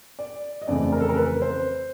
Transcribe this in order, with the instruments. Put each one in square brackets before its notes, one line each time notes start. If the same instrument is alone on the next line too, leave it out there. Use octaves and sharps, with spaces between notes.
[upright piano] D5
D#5
F2 C#3 E3 A3 D5
A#4
A4
A#4
B4
C5